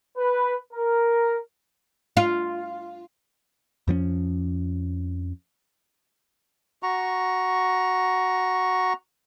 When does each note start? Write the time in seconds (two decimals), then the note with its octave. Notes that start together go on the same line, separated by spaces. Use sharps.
0.18 B4
0.73 A#4
2.17 F4
3.88 F2 F3 B3 C#4
6.83 F#4 A#5 C#6